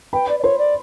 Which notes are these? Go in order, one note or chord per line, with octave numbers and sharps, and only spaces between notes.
B4 G5 B5
D5
D5
C5 C#5 C6
D5